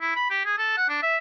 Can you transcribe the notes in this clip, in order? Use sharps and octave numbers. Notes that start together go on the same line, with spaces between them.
E4
B5
G4
G#4
A4
F#5
D4
E5